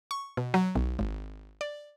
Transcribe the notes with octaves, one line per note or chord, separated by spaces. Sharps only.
C#6
B2
F#3
B1
G#1
D5